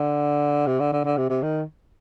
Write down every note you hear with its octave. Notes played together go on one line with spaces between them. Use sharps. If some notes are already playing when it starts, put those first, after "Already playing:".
Already playing: D3
C3
D3
D3
D3
C3
C3
D#3